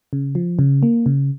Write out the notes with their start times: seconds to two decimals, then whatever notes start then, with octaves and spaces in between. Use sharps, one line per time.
0.13 C#3
0.35 F3
0.59 C#3
0.83 A#3
1.06 C#3